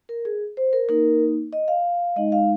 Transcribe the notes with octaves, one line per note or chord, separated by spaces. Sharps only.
A#4
G#4
C5
A#4
A#3 D#4 A#4
D#5
F5
G#3 D#4 D#5
F5